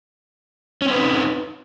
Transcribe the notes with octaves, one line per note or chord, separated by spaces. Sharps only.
C4 C#4 D#4 B4